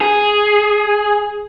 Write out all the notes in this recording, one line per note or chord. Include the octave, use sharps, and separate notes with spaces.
G#4